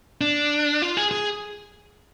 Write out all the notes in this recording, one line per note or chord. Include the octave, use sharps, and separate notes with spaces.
D4
F4
G#4
G#4